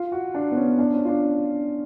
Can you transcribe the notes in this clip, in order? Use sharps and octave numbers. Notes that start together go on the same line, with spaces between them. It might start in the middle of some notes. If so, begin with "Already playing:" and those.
Already playing: F4
F#4
D4
B3
C#4
D4
C#4
F4
D4